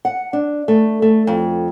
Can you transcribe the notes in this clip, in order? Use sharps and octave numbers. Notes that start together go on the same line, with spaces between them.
F#5
D4
A3
A3
F2